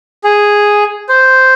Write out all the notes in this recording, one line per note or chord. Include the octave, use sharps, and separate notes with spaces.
G#4
C5